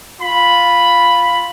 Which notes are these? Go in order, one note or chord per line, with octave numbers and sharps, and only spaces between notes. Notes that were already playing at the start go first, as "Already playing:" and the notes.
F4 B5